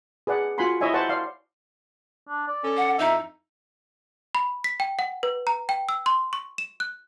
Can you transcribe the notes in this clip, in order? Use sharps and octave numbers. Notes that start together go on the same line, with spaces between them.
G#4 B4 D5 F#5
F4 F#4 F#5 G#5 B5 C6
E4 C#5 D#5 E5 G#5
C5 C#5 F#5 A5
D5 F5 C6
D4
D5
C#4 A4
F#5
F2 D#4 E4 D#5 E5
B5
B6
G5
F#5
B4
A#5
G5
E6
C6
C#6
E7
F#6